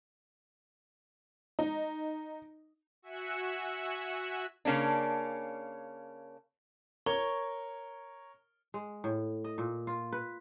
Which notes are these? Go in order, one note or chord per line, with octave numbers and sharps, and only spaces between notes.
D#4
F#4 E5 G#5 F#6 C#7 E7
C#3 A#3 C#4 D4
A#4 C#5 C#6 G7
G#3
A2
D#5
A#2
F4
B4